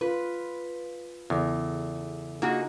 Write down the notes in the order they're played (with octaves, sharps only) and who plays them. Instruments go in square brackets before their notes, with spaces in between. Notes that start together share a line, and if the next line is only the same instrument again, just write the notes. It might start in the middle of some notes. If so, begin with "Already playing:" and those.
[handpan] F4 [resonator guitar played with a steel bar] B4
[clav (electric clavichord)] E2 [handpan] C#3 A4
[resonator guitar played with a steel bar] A#3 F#4 G#4 [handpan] D4 D#4 F4